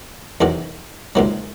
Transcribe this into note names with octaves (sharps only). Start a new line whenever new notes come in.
E2 C3 D#3 F#3
C#2 C3 D#3 F#3